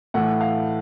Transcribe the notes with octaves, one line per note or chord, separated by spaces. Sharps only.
A2 E3 A3 F#5
F5